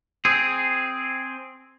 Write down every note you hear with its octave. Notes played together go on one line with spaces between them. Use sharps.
C4 G#4